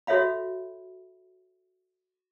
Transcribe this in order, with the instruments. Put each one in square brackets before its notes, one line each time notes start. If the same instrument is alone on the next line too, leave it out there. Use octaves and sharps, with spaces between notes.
[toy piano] F#4 A4 C#5 E5 F5 B5